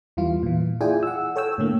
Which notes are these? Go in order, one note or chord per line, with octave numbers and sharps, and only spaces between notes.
E2 E3 G3 F4
A#2 E3
E4 F4 G#4 D5 G5 G#5
F#5 E6
A4 C#5 G5 E6
A2 D3 A#3